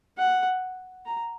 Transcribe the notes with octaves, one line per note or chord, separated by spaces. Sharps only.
F#5
A#5